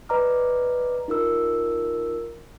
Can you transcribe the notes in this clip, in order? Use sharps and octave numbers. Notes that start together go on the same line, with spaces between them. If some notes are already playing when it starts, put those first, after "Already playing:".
B4 D5 D#5 A#5 D6 F6
D#4 F4 A#4 E6